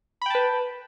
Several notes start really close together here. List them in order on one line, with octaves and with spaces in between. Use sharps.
B5 G5 A5 B4